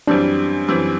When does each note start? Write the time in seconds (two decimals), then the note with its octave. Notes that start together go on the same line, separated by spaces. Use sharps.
0.07 F#2 E3 G3 C4 D4
0.68 F#2 E3 G3 C4